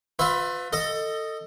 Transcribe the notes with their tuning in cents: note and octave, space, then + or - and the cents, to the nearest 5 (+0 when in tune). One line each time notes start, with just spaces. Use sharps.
F4 +35 B4 +30 E5 +0
A4 +20 D#5 +0